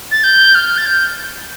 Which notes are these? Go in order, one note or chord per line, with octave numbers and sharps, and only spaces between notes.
A6
G6
F6
A6
G6